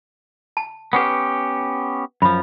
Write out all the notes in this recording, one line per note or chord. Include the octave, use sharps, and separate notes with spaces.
A5
B3 C#4 G4 B4 F#5
F#2 F3 B5